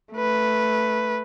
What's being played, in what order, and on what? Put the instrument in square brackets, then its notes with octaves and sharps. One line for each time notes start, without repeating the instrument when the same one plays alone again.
[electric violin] A3 B4